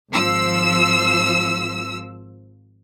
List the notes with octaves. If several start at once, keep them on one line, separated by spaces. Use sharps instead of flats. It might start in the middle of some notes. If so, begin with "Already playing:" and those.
G#1 F3 E6